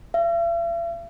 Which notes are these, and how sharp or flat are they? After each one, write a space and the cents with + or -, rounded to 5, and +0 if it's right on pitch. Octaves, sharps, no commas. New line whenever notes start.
E5 +45